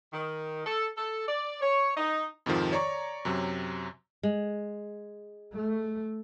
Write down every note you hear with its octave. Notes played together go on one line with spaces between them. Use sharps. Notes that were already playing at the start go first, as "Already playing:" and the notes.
D#3
A4
A4
D5
C#5
D#4
F2 G#2 C3 D#3 F3
C#5 D5 A#5 C#6
F#2 C3 F#3
G#3
A3